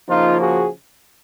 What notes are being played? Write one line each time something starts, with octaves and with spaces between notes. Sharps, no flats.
C#3 F3 A#3 D#4 F4
F#4 G#4